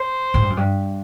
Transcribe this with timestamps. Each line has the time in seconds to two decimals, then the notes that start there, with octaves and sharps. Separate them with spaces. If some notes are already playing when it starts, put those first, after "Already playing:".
Already playing: C5
0.34 G#2
0.42 G2
0.50 F#2
0.57 G2